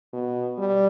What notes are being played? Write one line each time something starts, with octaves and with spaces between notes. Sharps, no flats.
B2
G3